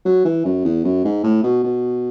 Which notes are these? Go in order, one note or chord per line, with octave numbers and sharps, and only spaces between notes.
F#3
E3
F#2
E2
F#2
G#2
A2
B2
B2